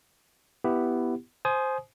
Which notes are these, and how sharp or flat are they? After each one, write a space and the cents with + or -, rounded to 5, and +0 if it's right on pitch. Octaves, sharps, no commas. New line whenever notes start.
B3 +5 E4 +5 G4 +0
C5 +0 G#5 +30 D#6 -5